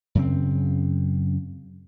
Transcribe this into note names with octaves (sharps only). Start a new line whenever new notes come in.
F#2 C#3 C4